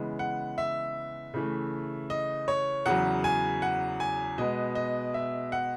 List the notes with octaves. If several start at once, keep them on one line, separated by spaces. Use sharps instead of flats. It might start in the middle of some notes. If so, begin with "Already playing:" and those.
Already playing: C#3 E3 G#3 B3
F#5
E5
C#3 E3 A3
D#5
C#5
E2 C#3 F#3 F#5
G#5
F#5
G#5
B2 G#3 B3 D#5
D#5
E5
F#5